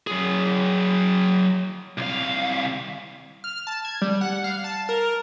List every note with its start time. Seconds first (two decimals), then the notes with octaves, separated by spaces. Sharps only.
0.07 F#3 G#4
1.98 C2 F5
3.44 F6
3.67 A5
3.85 G#6
4.01 G3
4.21 F#5
4.44 F5
4.64 A5
4.89 A#4